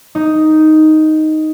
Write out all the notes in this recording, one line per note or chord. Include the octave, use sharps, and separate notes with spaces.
D#4